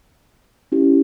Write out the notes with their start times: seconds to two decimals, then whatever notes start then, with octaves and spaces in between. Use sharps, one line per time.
0.72 C#4 E4 G4